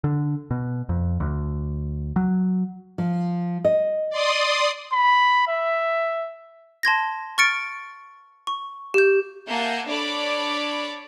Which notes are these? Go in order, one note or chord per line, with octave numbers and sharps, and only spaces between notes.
D3
B2
F2
D2
F#3
F3
D#5
D5 C6 D#6
B5
E5
A5 C6 G#6 A#6
C#6 F6 A6 C#7 D7
C#6
G4 G6
A#3 E5 F#5 G#5 A5 G6
D4 A4 C#5 D5 B5 D6